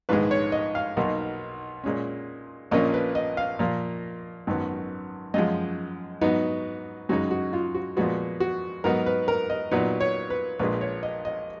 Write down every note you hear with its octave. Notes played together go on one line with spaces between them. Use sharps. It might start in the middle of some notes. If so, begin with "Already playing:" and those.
A#1 G#2 D#3 G#3 B4
C#5
D#5
F5
B1 B2 F#3 A#3 D#4
A#2 G#3 C#4
A#1 A#2 F3 A#3 C#4 D#5
B4
D#5
F5
A#2 F3 A#3
G#1 F#2 D#3 F#3 B3
F#2 F3 G#3 D#5
G#2 F#3 B3 D#4
F#2 C#3 G#3 D#4 F#4
F#4
F4
F#4
A#2 F3 G#3 B3 F#4
F#4
G#2 F#3 B3 D#4 A#4
B4
A#4
D#5
A#2 F#3 B3 D#4
C#5
B4
A#1 A#2 G#3 B4
C#5
D#5
D#5